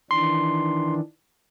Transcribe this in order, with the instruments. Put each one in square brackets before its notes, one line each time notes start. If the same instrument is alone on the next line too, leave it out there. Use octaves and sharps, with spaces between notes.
[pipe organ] D#3 E3 D4 [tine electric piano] C6